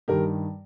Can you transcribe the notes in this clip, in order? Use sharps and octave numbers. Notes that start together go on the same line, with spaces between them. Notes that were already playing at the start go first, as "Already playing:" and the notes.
G2 D#3 G4 A#4